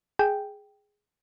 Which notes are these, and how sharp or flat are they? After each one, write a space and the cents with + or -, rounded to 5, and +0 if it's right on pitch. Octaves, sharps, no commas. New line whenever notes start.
G#4 +0 G5 +0